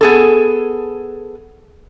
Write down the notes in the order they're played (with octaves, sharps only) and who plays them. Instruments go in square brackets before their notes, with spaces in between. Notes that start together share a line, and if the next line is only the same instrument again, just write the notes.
[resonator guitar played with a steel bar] B3 G#4 A4